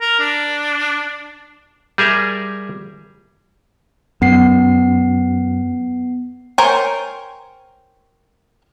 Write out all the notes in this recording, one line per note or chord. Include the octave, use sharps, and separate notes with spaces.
A#4
D4
G3 G#4 A#4 E5
F#2 B3 C7
A#4 C5 C#5 G5 G#5